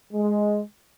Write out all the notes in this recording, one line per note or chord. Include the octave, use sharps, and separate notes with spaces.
G#3